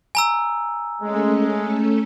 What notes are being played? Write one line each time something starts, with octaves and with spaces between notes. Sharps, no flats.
G#5 A#5 E6
G#3 A3 C#4 A4